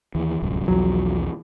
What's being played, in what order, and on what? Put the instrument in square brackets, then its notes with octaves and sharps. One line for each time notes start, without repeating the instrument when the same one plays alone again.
[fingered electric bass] D#2 E3
D1 C2 F#2
[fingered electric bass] B1 E2 F3 [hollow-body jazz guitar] F#3